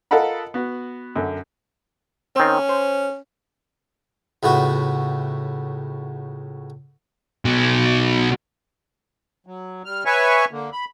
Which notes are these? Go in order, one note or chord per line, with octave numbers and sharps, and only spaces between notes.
F4 A4 A#4 D#5 F#5 B5
B3 F#4
F#2 D3
D#3 C4 C#4
C5
C#2 A2 B3 F#4
B2 F#3
F#3
G3 F6
B4 C#5 E5 G#5 C#6
D3 A#3
B5